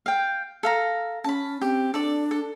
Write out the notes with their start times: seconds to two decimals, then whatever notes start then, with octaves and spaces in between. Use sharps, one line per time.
0.06 F5 G5
0.63 A4 F5 A#5
1.24 C#4 A5 B5
1.61 C4 G4
1.94 D4 A4 D5
2.31 A4